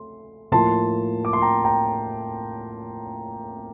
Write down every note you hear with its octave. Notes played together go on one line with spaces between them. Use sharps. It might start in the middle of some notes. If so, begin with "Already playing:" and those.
Already playing: A3 C6
A2 F3 A#3 A5 C6
D6
C6
G5 A#5
G5 A#5